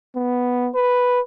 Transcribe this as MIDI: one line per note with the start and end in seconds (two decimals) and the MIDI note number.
0.16 0.70 59
0.75 1.20 71